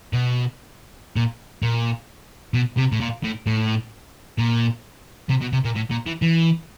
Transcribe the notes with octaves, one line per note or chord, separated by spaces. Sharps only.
B2
A#2
A#2
B2
C3
A2
A#2
A2
A2
A#2
C3
B2
C3
A#2
A2
A#2
E3
E3